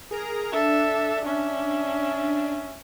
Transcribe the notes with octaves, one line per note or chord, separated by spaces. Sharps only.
G#4 A#4 A#5
D4 A4 E5
C#4 E5